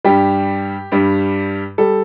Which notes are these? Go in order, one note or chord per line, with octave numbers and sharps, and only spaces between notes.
G2 G3 G4
G2 G3
G3 A4